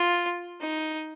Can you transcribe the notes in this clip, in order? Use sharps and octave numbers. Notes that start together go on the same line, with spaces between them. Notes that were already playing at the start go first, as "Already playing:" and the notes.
Already playing: F4
D#4